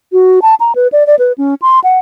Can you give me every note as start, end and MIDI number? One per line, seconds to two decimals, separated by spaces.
0.12 0.39 66
0.42 0.55 81
0.60 0.72 82
0.76 0.88 71
0.92 1.06 74
1.07 1.15 74
1.19 1.32 71
1.38 1.55 61
1.62 1.80 84
1.84 1.99 78